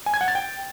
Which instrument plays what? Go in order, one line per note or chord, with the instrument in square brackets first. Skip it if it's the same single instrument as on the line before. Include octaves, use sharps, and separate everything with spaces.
[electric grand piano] G#5
G#6
F#5
A6
G5